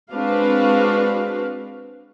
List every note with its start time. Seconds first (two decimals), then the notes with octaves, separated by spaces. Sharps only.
0.13 G#3 C4 D4 F#4 B4 F5